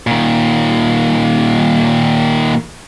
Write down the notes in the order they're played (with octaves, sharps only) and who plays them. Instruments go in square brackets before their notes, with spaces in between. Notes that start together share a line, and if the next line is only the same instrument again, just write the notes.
[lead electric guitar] A#2 D#3